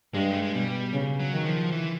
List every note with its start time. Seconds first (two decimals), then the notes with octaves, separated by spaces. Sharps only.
0.14 G2 G#3
0.31 A3
0.42 G#3
0.54 B2 G3
0.93 C#3
1.20 F#3
1.33 D#3
1.46 F3
1.72 E3